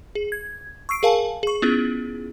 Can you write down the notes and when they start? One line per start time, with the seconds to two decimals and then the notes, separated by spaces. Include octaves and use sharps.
0.15 G#4
0.32 G#6
0.89 C#6 E6 C7 D7
1.03 G#4 A#4 F5 G#5 A5
1.43 G#4 C#6
1.62 B3 C#4 E4 F4 G#4